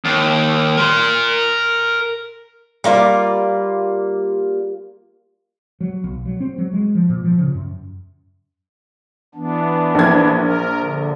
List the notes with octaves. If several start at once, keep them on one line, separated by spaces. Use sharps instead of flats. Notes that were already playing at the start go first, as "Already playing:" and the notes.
D#2
A#4 C6
G3 A#3 F4 D5
F#3
B1
F#3
C4
F#3
G#3
F3
A#2
F3
C#3
F#2
E3 B3 D4
A#1 G#6
A#4
D3